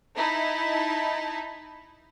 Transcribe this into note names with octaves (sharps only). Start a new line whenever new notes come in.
D#4 E4 A5